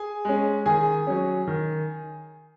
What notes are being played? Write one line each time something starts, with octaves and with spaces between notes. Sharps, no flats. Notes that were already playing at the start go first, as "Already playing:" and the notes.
Already playing: G#4 G#5
G#3 C#4
D#3 G#4 G#5
F#3 C#4
D#3